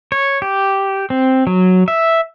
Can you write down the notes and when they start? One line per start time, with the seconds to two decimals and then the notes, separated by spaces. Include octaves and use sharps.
0.12 C#5
0.42 G4
1.10 C4
1.47 F#3
1.88 E5